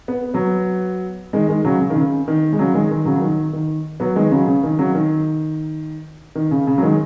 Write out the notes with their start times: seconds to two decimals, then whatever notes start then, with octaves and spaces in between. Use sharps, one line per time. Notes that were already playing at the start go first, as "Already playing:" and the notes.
0.08 B3
0.34 F#3 B3
1.33 D#3 G#3
1.48 D#3 G#3
1.65 C#3 F#3
1.80 C#3
1.90 D#3
1.96 C#3
2.28 D#3
2.53 G#3
2.59 C#3 F#3
2.74 D#3 G#3
2.91 D#3
3.05 C#3 F#3
3.16 F#3
3.22 D#3
3.53 D#3
4.00 F#3 B3
4.16 D#3 G#3
4.31 C#3 F#3
4.47 C#3
4.63 D#3
4.78 C#3 F#3
4.95 D#3
6.35 D#3
6.51 C#3
6.67 C#3
6.78 F#3
6.83 D#3 G#3